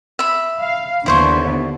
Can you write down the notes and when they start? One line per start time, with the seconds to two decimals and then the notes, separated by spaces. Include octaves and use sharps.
0.19 E5 B5
0.60 F5
1.06 D#2 D3 B3 E4 C5 C#6